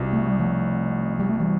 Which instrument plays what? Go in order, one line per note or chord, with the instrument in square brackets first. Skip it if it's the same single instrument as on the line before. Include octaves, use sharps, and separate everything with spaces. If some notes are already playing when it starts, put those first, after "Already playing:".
Already playing: [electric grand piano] C2 B2 B3 F4
[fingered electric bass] A3
G3
F3 A3
G3
A3
E3 G3